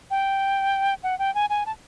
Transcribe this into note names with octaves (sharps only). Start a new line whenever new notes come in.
G5
F#5
G5
G#5
G#5
A5